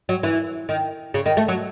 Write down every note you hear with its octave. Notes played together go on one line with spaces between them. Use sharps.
F#3
E3
D#3
C#3
D#3
A3
F#3